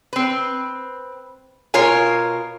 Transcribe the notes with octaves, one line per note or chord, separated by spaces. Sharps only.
C4 B4
B2 F4 A#4 C#5 G#5